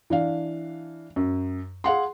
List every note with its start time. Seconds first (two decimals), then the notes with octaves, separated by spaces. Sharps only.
0.10 E3 D4 F5
1.16 F#2
1.84 G#4 F5 F#5 C6